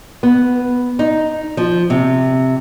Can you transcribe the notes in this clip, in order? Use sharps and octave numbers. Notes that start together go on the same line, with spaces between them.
B3
D#4
F3
C3